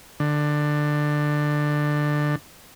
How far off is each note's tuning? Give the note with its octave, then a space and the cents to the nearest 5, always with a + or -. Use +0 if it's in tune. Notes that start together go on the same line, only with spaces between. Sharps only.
D3 +15